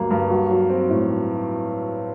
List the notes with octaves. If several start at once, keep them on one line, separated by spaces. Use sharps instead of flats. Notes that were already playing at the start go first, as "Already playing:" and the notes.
Already playing: D2 G2 F#3 A#3
G2
F#4
F#3
C4
A2